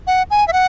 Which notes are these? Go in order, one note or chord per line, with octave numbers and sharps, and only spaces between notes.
F#5
G#5
E5
F#5